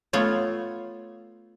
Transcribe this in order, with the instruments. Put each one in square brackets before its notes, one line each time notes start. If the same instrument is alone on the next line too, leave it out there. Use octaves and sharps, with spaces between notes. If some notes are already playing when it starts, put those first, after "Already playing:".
[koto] A3 B3 F4 C#5